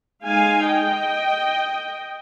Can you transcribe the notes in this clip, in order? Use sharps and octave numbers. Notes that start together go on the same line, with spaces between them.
G#3 D#4 F5 G#5
D#5 G5